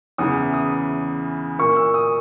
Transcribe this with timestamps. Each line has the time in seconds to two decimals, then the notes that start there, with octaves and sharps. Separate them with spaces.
0.18 E2 C#3 E3 D#6
0.54 D#6
1.59 A#2 A#3 C#6
1.76 E6
1.94 D#6